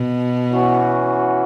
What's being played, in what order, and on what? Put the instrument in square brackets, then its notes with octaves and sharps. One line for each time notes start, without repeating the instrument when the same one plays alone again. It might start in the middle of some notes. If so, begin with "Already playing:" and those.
Already playing: [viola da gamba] B2
[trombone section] E3 C#4 F#4